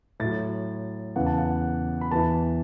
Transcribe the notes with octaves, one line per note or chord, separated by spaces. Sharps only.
A2 F#3 A6
E2 C#3 E3 F#5
A5
F#5
B5
E2 E3 A5